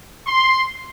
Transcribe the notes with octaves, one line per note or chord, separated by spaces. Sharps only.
C6